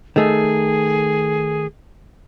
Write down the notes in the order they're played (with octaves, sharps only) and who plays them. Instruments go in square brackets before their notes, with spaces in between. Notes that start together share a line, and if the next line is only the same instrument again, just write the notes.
[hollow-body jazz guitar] D#3 A3 [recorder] G#4